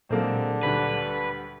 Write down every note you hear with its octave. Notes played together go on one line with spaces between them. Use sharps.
A#2 D3 F#3 G#3 A#3 C4
D2 G3 B4